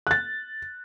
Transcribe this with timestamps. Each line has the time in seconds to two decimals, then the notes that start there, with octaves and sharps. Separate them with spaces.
0.07 F#6 A6